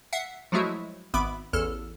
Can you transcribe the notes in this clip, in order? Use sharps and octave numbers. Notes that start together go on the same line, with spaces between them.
E5 F#5 C7
F3 F#3 G#3 A3 E4 F#4
G#1 B3 E5 B5 D6 D7
A1 E2 A4 F6